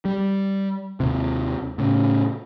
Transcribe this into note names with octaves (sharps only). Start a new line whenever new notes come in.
G3
D#2 C3
A2 C#3